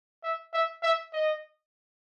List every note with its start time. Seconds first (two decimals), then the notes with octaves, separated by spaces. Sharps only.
0.24 E5
0.53 E5
0.83 E5
1.13 D#5